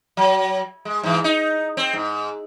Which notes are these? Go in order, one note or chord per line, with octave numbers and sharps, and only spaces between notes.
F#3
G#3
G#2 E3
D#4
C4
G#2